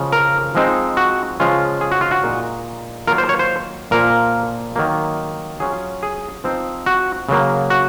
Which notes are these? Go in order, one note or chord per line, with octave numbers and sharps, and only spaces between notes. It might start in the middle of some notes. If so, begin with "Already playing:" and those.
Already playing: C#3 F3 G#3
A#4
F3 G#3 C4 D#4
F#4
C#3 F3 G#3 C#4 F4
G#4
F#4
F4
F#4
A#2 G#3 D#4
D#3 F#3 A#3 F4 A#4
C5
C#5
C5
A#2 F3 A#3 A#4
D#3 F#3 A#3
F#3 C#4 F4 G#4
G#4
F3 C4 D#4
F#4
C#3 F#3 A#3
F#4